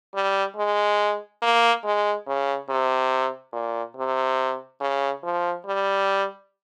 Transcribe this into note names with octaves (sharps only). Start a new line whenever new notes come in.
G3
G#3
A#3
G#3
C#3
C3
A#2
C3
C#3
F3
G3